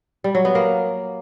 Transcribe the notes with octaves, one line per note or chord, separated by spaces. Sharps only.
G3
F#3
B3
A#3